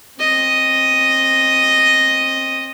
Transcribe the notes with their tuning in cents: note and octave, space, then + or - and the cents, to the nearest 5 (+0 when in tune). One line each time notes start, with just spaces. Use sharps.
C4 +25 D#5 +0